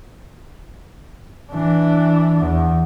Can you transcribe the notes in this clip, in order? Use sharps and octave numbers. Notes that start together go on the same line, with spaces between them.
E3 D4
E2